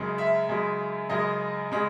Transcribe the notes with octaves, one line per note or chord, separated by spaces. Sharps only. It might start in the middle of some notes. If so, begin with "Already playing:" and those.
Already playing: F#2 C#3 G#3
E5
F#2 C#3 G#3
F#2 C#3 G#3 D#5
C#3 G#3